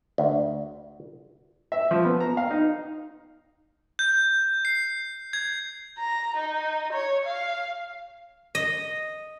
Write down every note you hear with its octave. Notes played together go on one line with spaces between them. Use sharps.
D2
E5
F3
B3
A#5
F5
D#4
G6
C7
G#6
A#5
D#4
C#5
F5
D#5